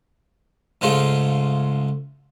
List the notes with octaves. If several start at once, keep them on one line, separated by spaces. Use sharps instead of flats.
G#2 C#3 A3 F4